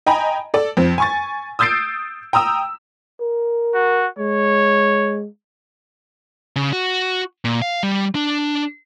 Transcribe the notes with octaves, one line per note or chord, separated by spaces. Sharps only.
D#5 G5 G#5 A#5 B5
A4 D5
F2 C4
G#5 C#6 A6
D#6 E6 G6 A6 C7 D7
G5 A#5 D#6 E6
A#4
F#4
G#3 C#5
C#3
F#4
A#2
F5
G3
D4